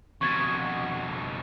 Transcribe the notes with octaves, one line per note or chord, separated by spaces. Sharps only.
F2 B2 C#6 G#6 A6